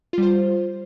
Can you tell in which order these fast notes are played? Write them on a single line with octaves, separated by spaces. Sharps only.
F4 G3 C5